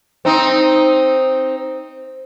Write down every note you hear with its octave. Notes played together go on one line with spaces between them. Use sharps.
C4 D#4